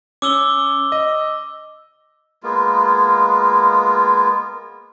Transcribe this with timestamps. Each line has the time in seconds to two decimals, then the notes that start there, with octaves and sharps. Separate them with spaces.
0.22 C#4 D6 E6 G7
0.92 D#5
2.43 G#3 A#3 B3 F4